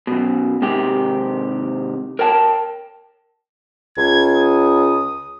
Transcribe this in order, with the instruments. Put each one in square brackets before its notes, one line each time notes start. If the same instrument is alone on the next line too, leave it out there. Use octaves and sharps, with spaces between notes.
[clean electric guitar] F#2 B2
G#2 C3 D#3 G4
A#4 C#5 G5 A5
[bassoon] C#2 [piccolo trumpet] G#6
[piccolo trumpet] D#6